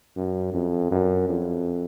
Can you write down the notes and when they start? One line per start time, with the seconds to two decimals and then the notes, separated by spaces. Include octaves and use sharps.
0.16 F#2
0.54 F2
0.91 F#2
1.29 F2